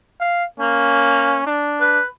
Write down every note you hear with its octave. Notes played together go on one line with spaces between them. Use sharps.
F5
A#3 C#4
D4
B4